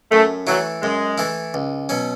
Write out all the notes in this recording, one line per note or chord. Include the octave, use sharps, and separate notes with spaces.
F#2 A3
E3 F#3 A3 E4
F#2 G#3
E3 A3 E4
C#2
B2 F#3 C#4